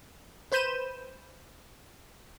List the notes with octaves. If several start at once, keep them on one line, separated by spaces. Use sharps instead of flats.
B4 C5 B5 G6 D#7 E7